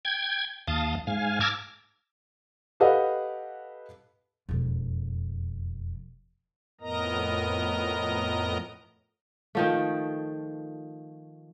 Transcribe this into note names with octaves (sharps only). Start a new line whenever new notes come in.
G5 G#6
D#2 F5 A5 D#6
G#2 F5 G#5
A5 A#5 D6 E6 F6 G#6
G4 A4 B4 D#5 F5 F#5
E1 F2
F2 A2 B3 A#4 D#5 A#5
D#3 F3 A3